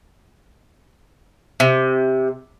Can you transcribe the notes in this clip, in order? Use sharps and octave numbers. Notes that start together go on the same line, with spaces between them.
C3